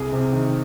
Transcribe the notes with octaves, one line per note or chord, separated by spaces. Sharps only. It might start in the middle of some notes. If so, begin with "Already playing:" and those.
Already playing: C2 G#4
C3
D#3